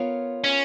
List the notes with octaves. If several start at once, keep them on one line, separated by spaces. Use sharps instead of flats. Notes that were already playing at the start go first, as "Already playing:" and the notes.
Already playing: B3 F4 A#4 C#5 F5
C#4